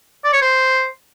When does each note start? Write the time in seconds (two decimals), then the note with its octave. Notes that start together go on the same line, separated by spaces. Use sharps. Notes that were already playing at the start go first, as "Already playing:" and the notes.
0.24 D5
0.33 C#5
0.42 C5